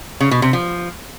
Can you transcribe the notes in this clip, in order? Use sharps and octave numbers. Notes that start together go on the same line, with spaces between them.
C#3
B2
C3
F3